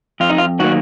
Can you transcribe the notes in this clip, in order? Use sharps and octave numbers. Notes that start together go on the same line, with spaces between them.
F2 F4
D#4
F4
D#3 F#3 A#3 F#4